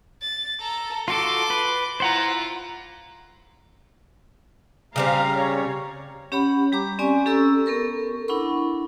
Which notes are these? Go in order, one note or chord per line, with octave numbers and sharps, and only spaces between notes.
A6
A4 A#5
F4 F#4 A4 C6 D6
B4
E4 F4 C5 F#5 A#5
C#3 G3 C4 F5 A#5
C#5
C#4 G4 C#5 F#5 B5
G3 G4 A#5 D6
C4 C#4 G4 D5 G#5 C#6
C#4 G4 A4 A#5 C#6 E6
B3 A4 A#4 C#6
D4 E4 F#5 B5 C#6